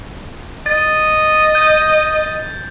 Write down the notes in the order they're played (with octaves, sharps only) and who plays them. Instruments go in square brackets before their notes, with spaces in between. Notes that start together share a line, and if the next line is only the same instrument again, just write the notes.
[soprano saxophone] D#5 [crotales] A6
[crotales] G6